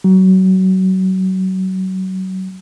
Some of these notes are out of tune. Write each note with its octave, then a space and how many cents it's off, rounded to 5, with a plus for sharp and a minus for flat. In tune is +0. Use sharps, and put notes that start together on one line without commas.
F#3 +25